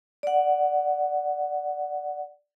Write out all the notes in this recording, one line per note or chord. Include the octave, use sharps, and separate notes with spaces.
D5 F#5